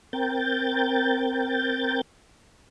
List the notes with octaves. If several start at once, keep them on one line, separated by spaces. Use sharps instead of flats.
C4 A#4 G5 G6 A6